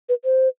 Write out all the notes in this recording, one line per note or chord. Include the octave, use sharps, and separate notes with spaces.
B4
C5